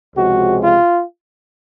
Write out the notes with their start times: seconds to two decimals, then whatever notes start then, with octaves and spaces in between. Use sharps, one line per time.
0.15 C#2 C3 F3 G#3 F#4
0.59 F4